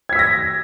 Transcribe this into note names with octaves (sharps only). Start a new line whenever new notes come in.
E6 G#6 A#6 B6